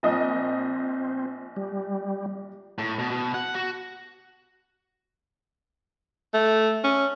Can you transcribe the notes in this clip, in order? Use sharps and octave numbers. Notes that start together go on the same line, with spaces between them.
A#1 C4 D#5 D#6
G3
A2
B2
B2
F#5
F#4
A3
C#4